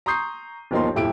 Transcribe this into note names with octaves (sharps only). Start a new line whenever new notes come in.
A#5 C6 C#6 D#6 G6 C7
G1 D#2 F3 D#4 A#4 C6
D#1 F2 E4 G4 D7